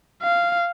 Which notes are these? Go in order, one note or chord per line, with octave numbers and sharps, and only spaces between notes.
F5